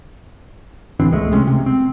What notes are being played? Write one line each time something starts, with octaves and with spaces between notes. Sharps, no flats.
A1 E3 C4 D4
C#2 G#3 A3
C3 G#3 C4 C#4
C3
C4